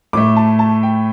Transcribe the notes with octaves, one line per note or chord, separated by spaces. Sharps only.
A2 A3 D6
A5
A5
G5